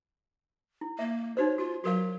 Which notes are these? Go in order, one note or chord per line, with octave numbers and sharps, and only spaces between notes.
E4
A#3 E5
D#4 F#4 C5 C#5
F4 F#4
F#3 F#4 A#4 F5